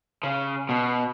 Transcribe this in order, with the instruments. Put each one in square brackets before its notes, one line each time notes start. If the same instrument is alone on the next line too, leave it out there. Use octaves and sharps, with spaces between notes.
[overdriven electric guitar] C#3
B2